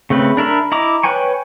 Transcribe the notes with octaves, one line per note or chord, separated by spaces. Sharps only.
C#3 A3 C4 B4
D4 A#4 E5 B5
E4 D#5 A#5 D6
B4 C#5 G5 G#5 C#6